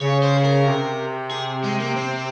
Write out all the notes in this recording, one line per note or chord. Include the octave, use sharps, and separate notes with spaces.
C#3 C#5
C5
G#4
A#4
C3
G#4
G#3
A#3
C4